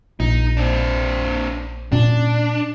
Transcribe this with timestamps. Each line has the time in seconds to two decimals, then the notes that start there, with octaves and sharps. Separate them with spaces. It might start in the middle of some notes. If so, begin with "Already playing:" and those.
0.20 A#1 D#4
0.57 C4 D4
1.92 A#2 C#4 D4